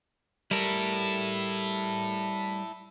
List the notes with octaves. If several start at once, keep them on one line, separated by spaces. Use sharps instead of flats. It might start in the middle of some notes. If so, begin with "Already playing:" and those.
G3 E4 A4 A#4